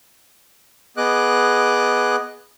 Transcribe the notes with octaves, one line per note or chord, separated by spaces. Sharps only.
B3 G#4 D#5 D6 F#6